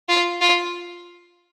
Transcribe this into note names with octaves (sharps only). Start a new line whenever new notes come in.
F4
F4